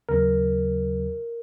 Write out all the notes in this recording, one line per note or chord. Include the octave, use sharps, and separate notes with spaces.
D#2 C#3 F#3 A#4